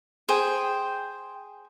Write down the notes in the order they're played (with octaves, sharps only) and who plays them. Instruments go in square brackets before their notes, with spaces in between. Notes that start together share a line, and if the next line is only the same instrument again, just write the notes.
[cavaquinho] G#4 [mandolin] C5 G5